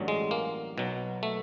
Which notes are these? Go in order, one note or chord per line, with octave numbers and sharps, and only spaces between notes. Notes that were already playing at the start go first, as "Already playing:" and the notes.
Already playing: A1 G2 D3 F#3
G#3
A#3
B1 B2 F#3
A3